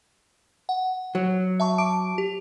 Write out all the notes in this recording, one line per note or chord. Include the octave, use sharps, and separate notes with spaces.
F#5
F#3
E5 A5 C#6
A5 D6 D7
G4